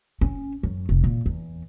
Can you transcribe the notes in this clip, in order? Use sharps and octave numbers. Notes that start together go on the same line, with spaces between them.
C#4
F#2
F1
A#2
E2